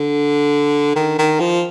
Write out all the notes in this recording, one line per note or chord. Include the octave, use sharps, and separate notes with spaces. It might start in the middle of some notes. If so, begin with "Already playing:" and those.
Already playing: D3
D#3
D#3
F3